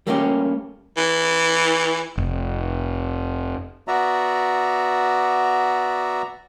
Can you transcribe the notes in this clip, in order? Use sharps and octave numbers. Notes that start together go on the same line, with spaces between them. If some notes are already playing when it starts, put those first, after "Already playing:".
G3 A3 A#3 C#4 F4 G4
E3
F1
B3 F#4 D5 E5 A#5